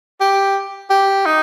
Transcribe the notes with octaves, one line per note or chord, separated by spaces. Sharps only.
G4
G4
D#4